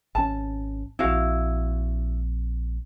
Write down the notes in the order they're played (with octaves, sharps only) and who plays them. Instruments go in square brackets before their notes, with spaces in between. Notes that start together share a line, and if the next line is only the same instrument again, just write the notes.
[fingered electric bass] G#1 C#4 [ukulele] A5
[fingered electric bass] A#1 C4 [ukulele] E4 F#4 F5